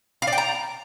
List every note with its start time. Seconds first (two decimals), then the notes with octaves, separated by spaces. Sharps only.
0.22 F5
0.27 D5
0.33 G5
0.38 A#5